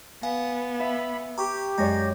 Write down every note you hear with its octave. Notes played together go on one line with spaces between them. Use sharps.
B3 F5 G#5
E5 B5
G4 A#5 C#6 D6
F#2 G#3 C#5 D5 A#5 G6 A#6